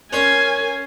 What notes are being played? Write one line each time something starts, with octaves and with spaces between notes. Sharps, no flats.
C#4 A#4 G#5 C6